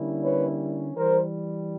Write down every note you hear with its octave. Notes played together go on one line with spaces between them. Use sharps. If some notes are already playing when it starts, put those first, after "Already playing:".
Already playing: D3 G3 A#3 C#4 E4
B4 C#5
E3 G3 A#4 C5